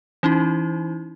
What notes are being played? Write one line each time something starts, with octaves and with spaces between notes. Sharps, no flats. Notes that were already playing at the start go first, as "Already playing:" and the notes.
E3 C#4 D#4 E4